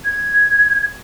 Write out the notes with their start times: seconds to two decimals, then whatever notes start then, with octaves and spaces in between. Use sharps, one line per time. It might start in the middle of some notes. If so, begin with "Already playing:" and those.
0.05 G#6